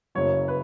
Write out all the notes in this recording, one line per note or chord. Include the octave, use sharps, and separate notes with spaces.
F#1 F#2 C#3 F#3 C#5
B4